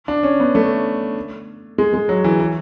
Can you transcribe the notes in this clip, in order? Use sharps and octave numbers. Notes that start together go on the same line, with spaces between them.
D4
C#4
B3
A3
G#3
G#3
F#3
E3
E3